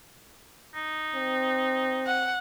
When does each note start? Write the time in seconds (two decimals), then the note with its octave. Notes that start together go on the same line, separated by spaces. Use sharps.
0.75 D#4
1.16 C4
2.06 F#5